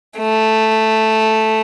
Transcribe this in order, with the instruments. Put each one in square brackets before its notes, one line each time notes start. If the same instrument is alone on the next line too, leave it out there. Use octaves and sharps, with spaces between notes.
[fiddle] A3